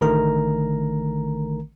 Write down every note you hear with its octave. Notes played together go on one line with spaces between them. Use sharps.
A1 D3 D#3 A3 A#4 A#5